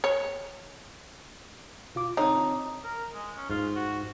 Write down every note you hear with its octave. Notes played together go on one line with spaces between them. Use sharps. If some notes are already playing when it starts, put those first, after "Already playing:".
C#5
B2 F4 D6
D3 C4 D#4 C#5
A#4
G#3
C#4
G#2 F4
F#4